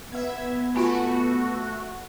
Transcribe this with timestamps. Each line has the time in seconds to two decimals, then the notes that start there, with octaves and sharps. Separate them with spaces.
0.12 B3 E5 G#6
0.75 A3 F4 F#4 G#5 B5